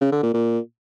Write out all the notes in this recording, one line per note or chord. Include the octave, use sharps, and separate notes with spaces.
C#3
D3
A#2
A#2